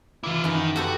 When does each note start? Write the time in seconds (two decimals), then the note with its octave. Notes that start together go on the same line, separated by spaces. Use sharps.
0.24 E3 E4 F4 D6
0.44 F#2 D#3 B4
0.76 A#3 B3 F#4 G4 A4 C5